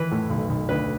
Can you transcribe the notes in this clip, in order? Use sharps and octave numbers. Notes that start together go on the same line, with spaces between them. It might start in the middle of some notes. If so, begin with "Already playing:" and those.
Already playing: E3 B4
A2
B1
B1
D2 B4